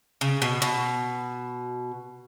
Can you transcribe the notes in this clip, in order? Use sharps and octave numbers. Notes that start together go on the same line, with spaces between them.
C#3
B2
B2